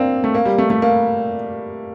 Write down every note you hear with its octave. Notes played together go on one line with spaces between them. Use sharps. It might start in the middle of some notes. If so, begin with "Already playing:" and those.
Already playing: A#3 C4 D4
A3
A#3
G3
A3
A3
A#3